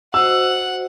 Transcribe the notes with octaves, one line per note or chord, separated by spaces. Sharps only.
F#4 C5 D#5 F#5 E6